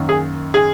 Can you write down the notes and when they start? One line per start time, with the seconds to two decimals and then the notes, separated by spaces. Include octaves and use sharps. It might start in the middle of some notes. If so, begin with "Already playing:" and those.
Already playing: F#2 D#3 A#3
0.09 G#4
0.54 G#4